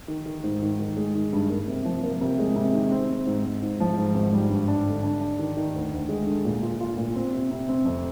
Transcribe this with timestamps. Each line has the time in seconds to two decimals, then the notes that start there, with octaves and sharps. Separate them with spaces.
0.08 D#3
0.26 D#3
0.43 G#2
0.62 D#3
0.79 D#3
0.97 G#3
1.15 D#3
1.33 G2
1.50 A#3
1.67 C3
1.85 F3
2.03 A#3
2.21 C3
2.39 G#3
2.56 C3
2.73 D#3
2.92 C4
3.10 C4
3.27 G#2
3.44 G#2
3.62 G#2
3.80 F3
3.98 G#2
4.14 G#1
4.33 G3
4.50 G2
4.68 D4
4.86 D3
5.03 D4
5.21 D4
5.39 D#3
5.57 D#3
5.74 D2
5.92 D2
6.09 G#3
6.27 D3
6.45 A#2
6.62 F4
6.81 F4
6.97 A#2
7.15 C4
7.32 C3
7.51 C3
7.69 C4
7.85 F2